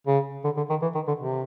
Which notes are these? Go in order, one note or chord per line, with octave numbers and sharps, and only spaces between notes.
C#3
D3
D3
D#3
E3
D#3
D3
C3